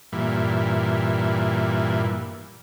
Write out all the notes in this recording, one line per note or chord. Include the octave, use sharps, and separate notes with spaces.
G2 A#2 E3